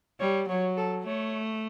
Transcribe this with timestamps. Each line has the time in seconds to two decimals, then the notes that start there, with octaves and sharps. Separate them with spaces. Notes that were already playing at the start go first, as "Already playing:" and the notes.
0.20 G3 C#5
0.49 F#3 C#5
0.78 A4
1.06 A3 C#5